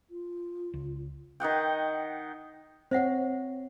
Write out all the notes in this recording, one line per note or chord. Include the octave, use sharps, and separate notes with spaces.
F4
C#2
D#3 D#5 F#5 G5
C4 C5 C#5 E5 F#5